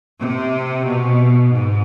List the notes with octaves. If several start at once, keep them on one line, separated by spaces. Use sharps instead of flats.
C3
B2
G#2